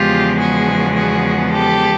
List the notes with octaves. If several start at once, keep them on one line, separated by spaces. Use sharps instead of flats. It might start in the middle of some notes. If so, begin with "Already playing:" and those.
Already playing: E2 C#3 F3 G#3 B3 F4 G4
F#4 G#4
F#4 G#4
G4 A4